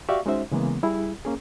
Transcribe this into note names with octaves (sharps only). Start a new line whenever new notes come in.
F#4 G4 D5 E5 F5 C#6
G#3 C#4 D#4 F#4 C5 E5
C#3 E3 G#3 A#3 B3
G3 E4 G#4
A#3 C#4 G#4